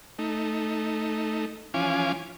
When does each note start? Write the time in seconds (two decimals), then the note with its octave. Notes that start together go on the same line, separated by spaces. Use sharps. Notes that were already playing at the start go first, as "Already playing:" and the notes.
0.19 A3 D#4
1.74 E3 F3 C#4 F5 G#5 D6